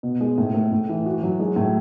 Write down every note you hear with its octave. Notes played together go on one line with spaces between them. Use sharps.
B2
G#3
A2
A2
A2
E3
F#4
F#3
G#3
A2